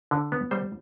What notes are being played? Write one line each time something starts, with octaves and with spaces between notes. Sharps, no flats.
D3
B3
G3 C5